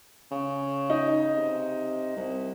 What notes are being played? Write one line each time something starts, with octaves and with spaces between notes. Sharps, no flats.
C#3
D#4
C3
C2